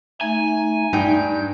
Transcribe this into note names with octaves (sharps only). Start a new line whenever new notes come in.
A3 D#4 G#5
G2 D#4 G5 G6